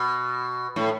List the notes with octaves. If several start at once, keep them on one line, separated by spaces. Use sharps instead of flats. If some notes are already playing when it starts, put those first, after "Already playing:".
Already playing: B2
A2